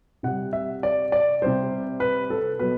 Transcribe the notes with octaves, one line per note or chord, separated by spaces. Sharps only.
C3 G3 F#5
E5
D5
D5
C3 G3 C5
B4
A4
B2 F#3 B4